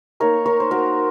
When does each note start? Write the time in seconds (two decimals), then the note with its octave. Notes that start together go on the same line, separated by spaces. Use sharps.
0.20 A#3 D#4 A#4 C#5
0.46 A#4 C#5
0.60 C5
0.71 F#4 A#4